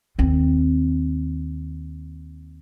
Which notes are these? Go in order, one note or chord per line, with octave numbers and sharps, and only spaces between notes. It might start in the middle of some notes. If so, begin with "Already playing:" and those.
D#2 C4